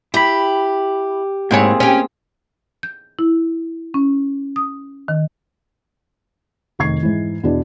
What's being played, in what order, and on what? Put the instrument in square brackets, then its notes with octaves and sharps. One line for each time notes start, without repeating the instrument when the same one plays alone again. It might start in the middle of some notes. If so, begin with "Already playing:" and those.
[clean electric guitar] E4 B5 [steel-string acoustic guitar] G4
[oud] G#2 E4 C#5 [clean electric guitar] A#3 C4 G#4
[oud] C#4 G4
[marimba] G6
E4
C#4
D#6
D#3
[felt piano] F1 D#3 C#6 G#6 C7
G#2 E3
E2 B2 D4